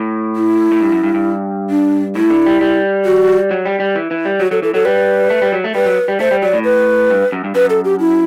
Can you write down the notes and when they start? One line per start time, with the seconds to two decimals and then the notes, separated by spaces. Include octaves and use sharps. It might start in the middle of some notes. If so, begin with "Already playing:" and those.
Already playing: A2
0.36 E4
0.72 A2
0.81 G2
0.92 F#2
1.03 G2
1.14 G2
1.70 D4
2.15 A2 E4
2.30 D3
2.46 G3
2.61 G3
3.05 F#4
3.51 F#3
3.65 G3
3.80 G3
3.95 E3
4.11 E3
4.25 G3
4.40 F#3 F#4
4.51 F#3 A4
4.62 E3 A4
4.74 F#3 A4
4.85 G3 B4
5.30 A3
5.42 G3
5.52 F#3
5.64 A3
5.75 G3 B4
5.86 F#3
6.08 G3
6.20 A3 C5
6.31 G3
6.42 F#3 D5
6.53 A2
6.64 B4
7.11 G2
7.32 F#2
7.44 G2
7.55 F#2 B4
7.70 A4
7.85 G4
8.00 E4